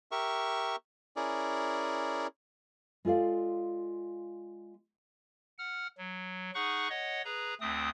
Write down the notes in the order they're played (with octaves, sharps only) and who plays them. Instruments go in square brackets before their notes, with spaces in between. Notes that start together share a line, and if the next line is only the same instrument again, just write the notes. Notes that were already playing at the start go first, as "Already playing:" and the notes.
[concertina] G4 A#4 E5 C#6
C#4 E4 G#4 A#4 D5
[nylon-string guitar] G#3 F4 A4 D5 F5
[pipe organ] F#5 F6
F#3
D#4 G#4 F#5 C#6 F#6
C#5 D#5 F#5
G#4 B4 A#5
D2 A3 C4 D#6